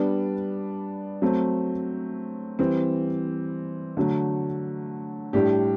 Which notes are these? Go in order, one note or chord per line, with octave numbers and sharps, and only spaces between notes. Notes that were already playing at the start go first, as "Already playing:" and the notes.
Already playing: G3 B3 D4
F#3 A3 C4
E3 G3 C4
D3 F#3 A3
A2 G3 D4 G4